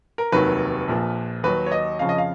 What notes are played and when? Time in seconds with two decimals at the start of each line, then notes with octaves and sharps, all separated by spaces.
0.18 A#4
0.32 F1 D#2 D#3 F#3 B4
0.88 A#1 A#2 F3
1.44 D#2 D#3 F#3 B4
1.66 C#5
1.72 D#5
1.99 F2 C#3 F3 F5
2.09 D#5
2.18 F5